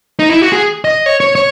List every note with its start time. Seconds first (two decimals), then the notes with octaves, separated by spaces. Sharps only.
0.19 D#4
0.30 E4
0.42 F#4
0.52 G#4
0.84 D#5
1.06 C#5
1.20 C#5
1.35 C#5